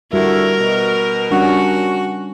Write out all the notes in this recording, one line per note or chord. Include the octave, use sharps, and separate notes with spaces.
D3 G3 A3 E4 F#4 A#4
B2
G3 C#4 D4 F#4